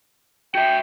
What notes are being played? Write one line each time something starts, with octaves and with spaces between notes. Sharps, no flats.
F#4 E5 G5